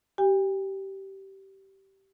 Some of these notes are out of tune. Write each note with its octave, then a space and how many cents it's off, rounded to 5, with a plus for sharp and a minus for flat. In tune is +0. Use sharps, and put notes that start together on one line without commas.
G4 -20 G5 +45